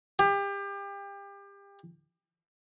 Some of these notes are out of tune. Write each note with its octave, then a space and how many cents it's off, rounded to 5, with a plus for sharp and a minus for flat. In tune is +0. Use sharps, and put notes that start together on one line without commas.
G4 +30